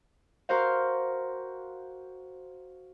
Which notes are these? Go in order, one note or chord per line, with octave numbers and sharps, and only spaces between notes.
F#4 A#4 C5 F5